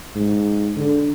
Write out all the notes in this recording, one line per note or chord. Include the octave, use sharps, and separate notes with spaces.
G#2
D3